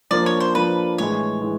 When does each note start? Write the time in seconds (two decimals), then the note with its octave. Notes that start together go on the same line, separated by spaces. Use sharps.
0.11 F3 A#3 D4 D5
0.26 C#5
0.40 C5
0.54 F3 A#3 D4 B4
0.98 A2 E3 G#3 C#5
1.41 A2 E3 G#3